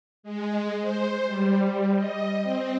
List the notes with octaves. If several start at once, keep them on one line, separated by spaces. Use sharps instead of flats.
G#3
C5
G3
D#5
C4